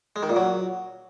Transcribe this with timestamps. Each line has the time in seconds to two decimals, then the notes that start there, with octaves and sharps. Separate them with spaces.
0.16 G#3
0.23 D#3
0.29 A#2
0.36 F#3